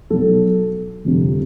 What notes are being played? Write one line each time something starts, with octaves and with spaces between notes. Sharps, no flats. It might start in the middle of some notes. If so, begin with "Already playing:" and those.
B1 B2 F#3 A4
G1 F2 C3